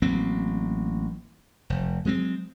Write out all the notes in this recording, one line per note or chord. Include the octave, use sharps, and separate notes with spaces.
A1 F#3 A#3 C4
F1
F#3 G#3 A#3 C4